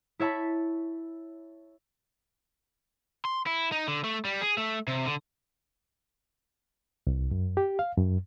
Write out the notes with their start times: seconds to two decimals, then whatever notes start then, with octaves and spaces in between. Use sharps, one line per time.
0.19 E4 C#5 E5 A5 B5
3.25 C6
3.47 E4
3.72 D#4
3.88 D3
4.04 A3
4.25 G3
4.41 G#4
4.58 A3
4.88 C3
5.06 D3
7.07 C2
7.31 F#2
7.57 G4
7.79 F5
7.97 F#2